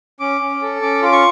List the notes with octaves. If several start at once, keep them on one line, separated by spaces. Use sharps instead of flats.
C#4 D6
C#4
A4
C#4 D6
F4 D6
C#6